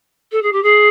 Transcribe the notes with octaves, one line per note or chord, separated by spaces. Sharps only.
A4
G#4
G4
G#4